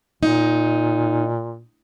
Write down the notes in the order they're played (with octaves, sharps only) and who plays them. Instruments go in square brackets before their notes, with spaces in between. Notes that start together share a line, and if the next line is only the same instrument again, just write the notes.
[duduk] A#2 [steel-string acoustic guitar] D#4